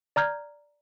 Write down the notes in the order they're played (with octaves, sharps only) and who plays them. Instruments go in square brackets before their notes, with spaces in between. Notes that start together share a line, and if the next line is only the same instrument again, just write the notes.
[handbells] D5 A#5 F6 G6 G#6